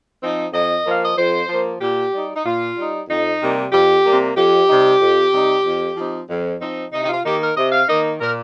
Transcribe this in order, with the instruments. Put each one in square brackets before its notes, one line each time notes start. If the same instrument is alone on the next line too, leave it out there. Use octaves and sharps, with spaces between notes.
[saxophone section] F3 C4 D#4
F2 D#5
F3 A#3
F5
D#5
F2 C5
F3 A#3
A#2 G4
G3 D#4
D#4
A#2 F4
G3 D#4
F2 D#4
C3 G3 A#3
F2 G4
C3 G3 A#3
F2 G4
C3 G3 D#4
F2
C3 G3 D#4
F2
F3 C4 D#4
F2
F3 C4 D#4
C3 D#4
D#4
F4
D#3 A#3 D#4 G4
A#4
C3 D#5
F5
D#3 A#3 D#4 D#5
A#2 A#4